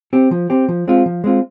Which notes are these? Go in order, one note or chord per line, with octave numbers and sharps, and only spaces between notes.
C4 G4
F3
C4 G4
F3
G#3 C4 F4
F3
G#3 C4 F4